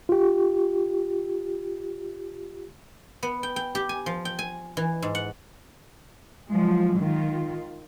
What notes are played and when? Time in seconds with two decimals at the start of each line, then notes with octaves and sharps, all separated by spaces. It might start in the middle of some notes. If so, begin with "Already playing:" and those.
0.09 F4 G4
3.23 B3
3.43 G5
3.56 G5
3.75 G4
3.89 G#5
4.06 F3
4.25 G5
4.39 G#5
4.77 E3
5.02 G#2
5.15 F#5
6.49 F3 F#3 G#3
6.99 D#3 F4